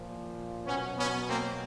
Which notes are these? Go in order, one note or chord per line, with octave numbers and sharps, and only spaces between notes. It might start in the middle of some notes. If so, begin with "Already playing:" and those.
Already playing: A#2 F3
B2 F#3 B3 C#4
B3 C#4
A#3 C4